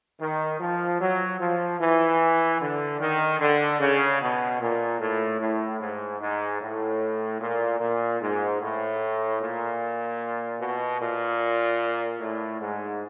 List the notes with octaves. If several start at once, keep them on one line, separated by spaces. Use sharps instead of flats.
D#3
F3
F#3
F3
E3
D3
D#3
D3
C#3
B2
A#2
A2
A2
G#2
G#2
A2
A#2
A#2
G#2
A2
A#2
B2
A#2
A2
G#2